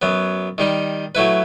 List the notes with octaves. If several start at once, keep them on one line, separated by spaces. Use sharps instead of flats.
F#2 F#3 B3
D#3 G3 D#4
F#3 A3 E4 B4